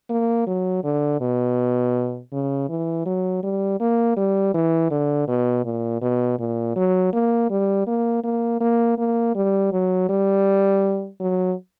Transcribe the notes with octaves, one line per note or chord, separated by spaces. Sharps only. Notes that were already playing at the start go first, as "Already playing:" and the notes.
A#3
F#3
D3
B2
C#3
E3
F#3
G3
A#3
G3
E3
D3
B2
A#2
B2
A#2
F#3
A#3
G3
A#3
A#3
A#3
A#3
G3
F#3
G3
F#3